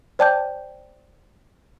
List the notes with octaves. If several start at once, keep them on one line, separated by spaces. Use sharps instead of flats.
C5 D5 G5 A5 D6 G6